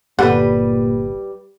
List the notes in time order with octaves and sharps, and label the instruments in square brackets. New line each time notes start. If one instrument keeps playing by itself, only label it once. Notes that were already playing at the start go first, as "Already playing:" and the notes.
[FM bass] G1 [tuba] A#2 [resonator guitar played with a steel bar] G3 B4 [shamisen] G4 A4 F#5